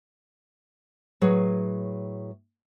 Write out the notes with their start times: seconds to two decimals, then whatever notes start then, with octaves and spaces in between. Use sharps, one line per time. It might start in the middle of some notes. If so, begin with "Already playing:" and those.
1.21 A2 F#3 G#4 B4 C#5